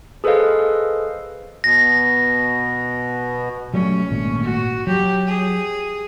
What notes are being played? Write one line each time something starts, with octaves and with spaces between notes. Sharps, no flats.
G#4 A4 B4 C5 D#5 F5
B2 A#6
F#3 G3 A3 C#4
G#1 A#2 A3
F#4
F#3 G4
G#4